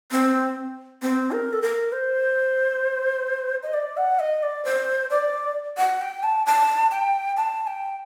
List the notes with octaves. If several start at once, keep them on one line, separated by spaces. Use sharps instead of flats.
C4
C4
A#4
A4
A#4
C5
D#5
D5
F#5
D#5
D5
C5
D5
F#5
G5
A5
A5
G5
A5
G5